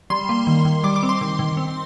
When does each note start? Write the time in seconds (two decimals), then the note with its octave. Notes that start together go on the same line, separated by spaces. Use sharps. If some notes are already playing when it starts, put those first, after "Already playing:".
0.10 G3 C6
0.29 A#3
0.47 D#3
0.65 D#3
0.84 G3 D6
0.96 D6
1.03 C4
1.09 C6
1.21 D#3
1.39 D#3
1.57 C4